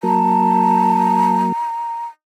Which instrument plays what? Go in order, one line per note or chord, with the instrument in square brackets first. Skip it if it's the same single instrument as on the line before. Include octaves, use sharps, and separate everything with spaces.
[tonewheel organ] F#3 A#3 [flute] A5 [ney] A#5